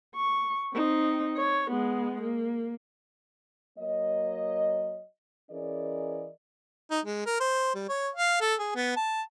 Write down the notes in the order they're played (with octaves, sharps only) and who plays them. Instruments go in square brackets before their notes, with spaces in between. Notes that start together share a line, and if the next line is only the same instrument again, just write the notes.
[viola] C#6
C4 D#4
C#5
G#3 B3
A#3
[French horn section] F#3 A#3 C#5 D#5
E3 C#4 G#4 A#4 D5 D#5
[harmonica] D#4
G#3
A#4
C5
G3
C#5
F5
A4
G#4
B3
A5